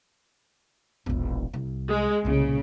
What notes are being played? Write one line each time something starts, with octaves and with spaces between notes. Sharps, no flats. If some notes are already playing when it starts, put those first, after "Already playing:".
E1 A#1
C2
G#3
C2 A#2 C#3